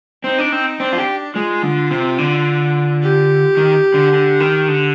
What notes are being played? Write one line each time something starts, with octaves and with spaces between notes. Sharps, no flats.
C4 D#4
D4
C4
C4 D4
F4
G4
G#3 F4
D3
C3
D3
G4
D#3
D3
D3
D#3
D3